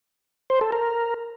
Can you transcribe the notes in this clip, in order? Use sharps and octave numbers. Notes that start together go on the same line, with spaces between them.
C5
A4
A#4